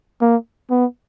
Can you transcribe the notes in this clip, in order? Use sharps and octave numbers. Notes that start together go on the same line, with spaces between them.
A#3
B3